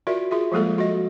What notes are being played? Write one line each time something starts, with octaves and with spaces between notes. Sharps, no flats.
F4 F#4 A#4 D5 E5
F4 G#4 E5
F3 G3 G#3 A#3 A4
F#4 D#5